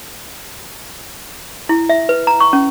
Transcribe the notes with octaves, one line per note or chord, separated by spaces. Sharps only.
E4
E5
B4
A#5
C#6
C#4